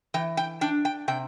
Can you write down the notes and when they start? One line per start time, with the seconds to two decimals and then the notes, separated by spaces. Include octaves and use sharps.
0.14 E3 G5
0.37 G5
0.61 D4 G5
0.85 G5
1.08 C3 G5